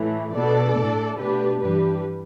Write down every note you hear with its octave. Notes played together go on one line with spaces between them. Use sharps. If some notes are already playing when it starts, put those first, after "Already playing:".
Already playing: A2 E3 A3
B2 B3 D4 A4 D5
A2 A3 D4
B2 A3 D4 G4 B4
G2 E3 G3 D4 G4 B4